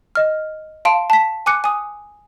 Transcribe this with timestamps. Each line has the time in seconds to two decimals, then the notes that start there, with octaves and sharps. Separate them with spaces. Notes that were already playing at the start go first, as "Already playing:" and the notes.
0.15 D#5 F6
0.85 F5 A5 C6 D7
1.10 A5 B6
1.46 G#5 D6 F#6 C#7
1.64 G#5 D#6